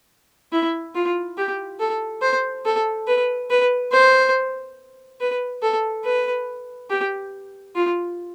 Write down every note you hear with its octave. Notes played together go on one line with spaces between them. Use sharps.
E4
F4
G4
A4
C5
A4
B4
B4
C5
B4
A4
B4
G4
F4